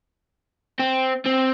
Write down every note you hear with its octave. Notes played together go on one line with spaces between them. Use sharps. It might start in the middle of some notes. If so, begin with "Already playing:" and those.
C4
C4